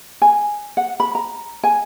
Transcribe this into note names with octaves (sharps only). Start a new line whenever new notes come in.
G#5
F#5
B5
A#5
G#5